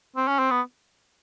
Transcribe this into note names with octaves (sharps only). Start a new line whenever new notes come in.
C4
C#4
C4
B3